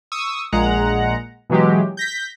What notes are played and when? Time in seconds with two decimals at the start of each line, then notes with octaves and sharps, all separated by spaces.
0.12 C#6 D#6 E6
0.52 A#1 A#2 G#3 F#5 A#5
1.50 B2 E3 F#3 G#3 G4
1.97 G6 A#6 B6